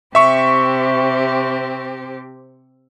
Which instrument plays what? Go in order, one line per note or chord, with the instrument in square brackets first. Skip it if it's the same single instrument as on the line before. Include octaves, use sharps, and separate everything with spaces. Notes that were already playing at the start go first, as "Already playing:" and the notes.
[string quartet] C3 C4 G4 [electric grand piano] E5 C#6